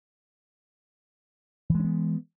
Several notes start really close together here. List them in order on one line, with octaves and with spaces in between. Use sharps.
E3 G#3 C#4 B3